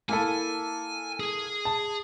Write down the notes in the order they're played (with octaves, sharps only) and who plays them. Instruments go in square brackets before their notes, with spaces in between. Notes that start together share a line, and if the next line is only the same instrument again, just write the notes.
[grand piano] A#3 E4 A4 [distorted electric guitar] G#5
[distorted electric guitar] G#4
[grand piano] A5